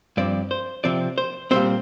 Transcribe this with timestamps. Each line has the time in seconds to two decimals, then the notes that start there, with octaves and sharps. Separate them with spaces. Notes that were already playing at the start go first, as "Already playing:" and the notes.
0.17 G2 F3 C4 D5
0.51 C5
0.84 C3 F3 C4 D5
1.18 C5
1.51 A#2 G3 C4 C5